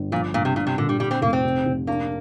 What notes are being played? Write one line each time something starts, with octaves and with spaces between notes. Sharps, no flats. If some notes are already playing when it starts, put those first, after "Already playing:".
Already playing: G1
A#2 F3
G1 A#2
C3
A#2 D4
C3
A#2 D3
G3
D3 G3
C4
F1 A#3
C4
C3
F1
A#3 D4